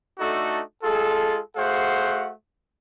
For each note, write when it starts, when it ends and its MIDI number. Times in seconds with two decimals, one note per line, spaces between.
0.20 0.61 57
0.20 0.61 62
0.20 0.61 63
0.20 0.61 66
0.20 0.61 69
0.83 1.40 56
0.83 1.40 65
0.83 1.40 68
0.83 1.40 69
1.56 2.31 57
1.56 2.31 66
1.56 2.31 68
1.56 2.31 72
1.56 2.31 77
1.56 2.31 78